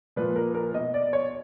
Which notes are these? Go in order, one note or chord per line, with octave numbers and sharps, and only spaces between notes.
A#2 F3 B4
A#4
A#4
B2 D#5
D5
C#5